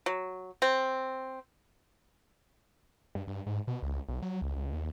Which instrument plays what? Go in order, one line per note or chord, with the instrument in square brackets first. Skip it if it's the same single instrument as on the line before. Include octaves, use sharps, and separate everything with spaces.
[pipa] F#3
C4
[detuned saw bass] G2
G2
G#2
B2
C#2
B1
F#3
C#2
C#2
D#2